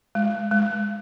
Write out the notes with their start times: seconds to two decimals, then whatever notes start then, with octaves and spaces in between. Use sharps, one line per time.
0.15 G#3
0.51 G#3